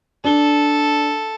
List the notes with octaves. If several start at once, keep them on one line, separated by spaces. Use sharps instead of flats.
D4 A4 G7